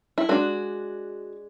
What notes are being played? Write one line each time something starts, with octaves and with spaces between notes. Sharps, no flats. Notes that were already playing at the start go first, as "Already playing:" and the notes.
E4
G#3 D4 F#4